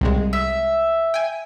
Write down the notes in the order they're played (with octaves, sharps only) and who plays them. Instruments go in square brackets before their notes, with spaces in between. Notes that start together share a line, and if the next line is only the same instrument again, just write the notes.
[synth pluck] C2 C3 G#3
[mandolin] E5
[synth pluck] G5 G#5